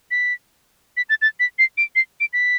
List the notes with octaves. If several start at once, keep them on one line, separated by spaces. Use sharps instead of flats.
B6
B6
A6
A6
B6
C7
D7
C7
D7
B6